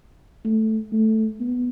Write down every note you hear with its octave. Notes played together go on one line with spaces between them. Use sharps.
A3
A3
B3